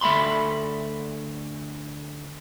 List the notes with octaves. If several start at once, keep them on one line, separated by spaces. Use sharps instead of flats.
D2 A3 E5 B5 C6